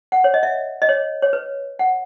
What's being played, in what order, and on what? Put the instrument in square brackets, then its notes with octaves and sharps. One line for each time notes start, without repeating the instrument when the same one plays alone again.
[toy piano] F#5
C#5
D#5
E5
D#5
C#5
C#5
B4
F#5